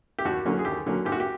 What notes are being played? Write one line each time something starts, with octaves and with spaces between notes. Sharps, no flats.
G4
D#2 F#4
D3 F#3 A#3 C#4
G#4
D#2 G4
D3 F#3 A#3 C#4
G#2 G4
F#4
G4